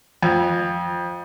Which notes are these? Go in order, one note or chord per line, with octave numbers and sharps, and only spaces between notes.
F2